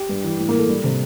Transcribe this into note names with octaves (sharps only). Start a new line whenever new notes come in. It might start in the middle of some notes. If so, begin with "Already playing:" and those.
Already playing: G4 G5
G2
E3
A2
A#3 A#4
E3 A4
G3
C3